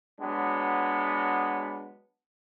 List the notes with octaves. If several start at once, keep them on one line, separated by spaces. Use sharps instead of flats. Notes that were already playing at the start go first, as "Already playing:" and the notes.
F#3 G#3 B3 D4